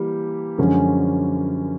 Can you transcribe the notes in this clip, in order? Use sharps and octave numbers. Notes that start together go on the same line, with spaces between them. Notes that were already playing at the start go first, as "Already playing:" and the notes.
Already playing: E3 G3 A#3 G4
F#2 D3 F3 G#3 C#4